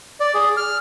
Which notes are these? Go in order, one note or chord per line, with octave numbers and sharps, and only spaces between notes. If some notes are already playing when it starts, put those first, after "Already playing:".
D5
G#4
F6